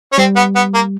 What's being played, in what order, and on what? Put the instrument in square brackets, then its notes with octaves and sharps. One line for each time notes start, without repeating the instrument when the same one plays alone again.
[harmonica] C#4
[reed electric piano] G3 [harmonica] C4
[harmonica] B3
B3
A#3